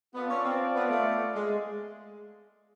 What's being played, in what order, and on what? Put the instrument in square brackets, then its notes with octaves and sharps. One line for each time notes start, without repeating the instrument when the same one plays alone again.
[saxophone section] B3 [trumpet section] F4 A4 D5 F5
[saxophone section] C#4
C4
B3
A3
G#3